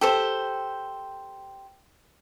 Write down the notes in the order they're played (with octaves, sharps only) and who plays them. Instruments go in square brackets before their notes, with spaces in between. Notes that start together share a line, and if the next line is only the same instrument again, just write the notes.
[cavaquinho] G4 A4 C5